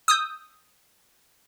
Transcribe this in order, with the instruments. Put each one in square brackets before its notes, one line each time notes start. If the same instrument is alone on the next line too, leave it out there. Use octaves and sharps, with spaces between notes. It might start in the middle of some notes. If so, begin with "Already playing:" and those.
[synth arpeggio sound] D#6 E6 G6